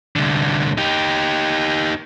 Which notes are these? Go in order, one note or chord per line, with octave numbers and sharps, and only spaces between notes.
C2 D3
D#4 G4